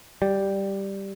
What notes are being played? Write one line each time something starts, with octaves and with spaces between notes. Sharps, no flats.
G3